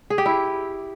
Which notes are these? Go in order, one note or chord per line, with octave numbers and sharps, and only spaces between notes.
G#4
G4
E4